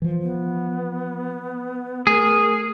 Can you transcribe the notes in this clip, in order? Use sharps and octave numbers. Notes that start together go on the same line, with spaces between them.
E3 F3
B3
A3 G#4 A#4